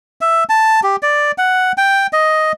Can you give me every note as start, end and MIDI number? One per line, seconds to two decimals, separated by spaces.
0.21 0.44 76
0.49 0.80 81
0.83 0.96 67
1.03 1.32 74
1.38 1.72 78
1.78 2.07 79
2.13 2.52 75